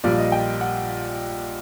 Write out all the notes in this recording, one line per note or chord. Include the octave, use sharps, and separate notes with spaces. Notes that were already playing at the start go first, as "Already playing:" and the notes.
A#1 A#2 G3 A#3 D5
D#5
G5
F#5